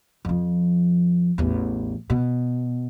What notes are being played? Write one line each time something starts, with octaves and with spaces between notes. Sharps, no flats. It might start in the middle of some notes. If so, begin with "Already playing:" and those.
F2 F3
A1 E2
B2